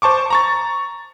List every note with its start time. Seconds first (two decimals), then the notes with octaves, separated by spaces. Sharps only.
0.02 C5 A5 C#6 D6
0.30 A#5 C#6 A6